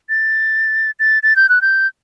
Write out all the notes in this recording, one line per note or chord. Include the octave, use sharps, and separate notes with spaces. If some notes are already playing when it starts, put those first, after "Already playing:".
A6
A6
A6
G6
F#6
G6